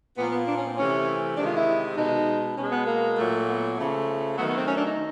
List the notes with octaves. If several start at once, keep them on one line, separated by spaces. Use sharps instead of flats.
A#2 F3 A#3 B3
B3
D4
C#4
C4
C3 E3 A3 C#4
C3 D#3 G#3 D4
F4
E4
B2 G#3 D#4
B2 G#3 C#4
B3
A#3
A#2 F#3 A3
B3
C#3 F3 A3
D#3 F#3 A3 B3
B3
C4
C#4
D4
D#4